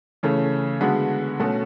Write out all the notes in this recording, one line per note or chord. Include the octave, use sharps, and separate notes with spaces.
C#3 E3 A3 C#4
D3 G#3 B3 F#4
B2 A3 C#4 F#4